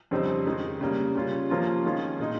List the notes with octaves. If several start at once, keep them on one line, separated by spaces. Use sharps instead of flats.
F2 C#3 G3 C4 D#4
D#3 G#3 D#4
C#3 G3 A#3
C#3 G3 C#4 F4
C3 F3 A#3 C#4 F4
D#3 G#3 C#4 F4
A#2 G#3 D#4